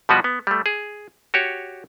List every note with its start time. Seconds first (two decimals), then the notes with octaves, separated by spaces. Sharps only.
0.09 B2 F3 G3 B3 F#4 B4
0.24 B3
0.47 G3 A3
0.66 G#4
1.34 F#4 G4 C#5